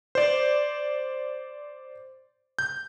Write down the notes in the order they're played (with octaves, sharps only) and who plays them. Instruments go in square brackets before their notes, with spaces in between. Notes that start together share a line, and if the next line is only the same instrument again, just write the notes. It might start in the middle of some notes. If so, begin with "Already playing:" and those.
[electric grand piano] C5 D5
G6